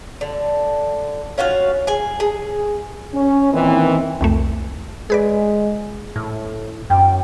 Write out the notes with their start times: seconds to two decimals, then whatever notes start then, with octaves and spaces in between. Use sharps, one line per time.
0.21 D3
1.38 C#4 F4 F#4 F5
1.87 G#4 G#5
2.20 G#4
3.14 C#4
3.52 A#2 D#3 E3 C4
4.21 C2 F2 A3
5.10 G#3 G#4 B4 D5
6.16 A2
6.90 F#2 G5